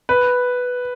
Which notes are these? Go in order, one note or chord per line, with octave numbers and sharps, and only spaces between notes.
B4